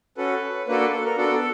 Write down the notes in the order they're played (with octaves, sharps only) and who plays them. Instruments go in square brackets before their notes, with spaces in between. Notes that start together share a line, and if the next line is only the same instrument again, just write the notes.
[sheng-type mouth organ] C#4 F#4 A4 B4
A#3 D4 F#4 A4 B4
B4
A4
A#4
B3 D4 F#4 A4
A4